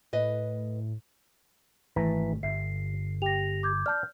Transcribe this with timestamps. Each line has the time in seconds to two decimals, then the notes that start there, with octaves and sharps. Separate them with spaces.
0.13 A2 B4 D#5
1.96 G#1 E3 A3 A5 A#5 B6
2.43 G1 E5 C7
3.22 G4 A#6 F7
3.63 D6 G6 G#6
3.86 D5 A5 F6 G6